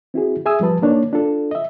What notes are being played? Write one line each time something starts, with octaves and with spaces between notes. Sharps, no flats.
C4 E4 F#4 G#4
G#4 E5 G#5 D#6 E6
F3 G3 B4 A5
A#3 D4 D#4 C#5
D4 F4 A4
D#5 E5